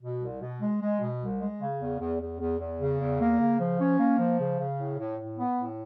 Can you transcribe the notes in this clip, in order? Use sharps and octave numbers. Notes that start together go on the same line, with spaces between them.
B2
C2
B2
G#3
G#3
B2
C2
G#3
C#3
E2
E2
E2
E2
E2
C#3
E2
A#3
C#3
F3
C#4
A#3
F3
C#3
C#3
A2
A2
A2
B3
A2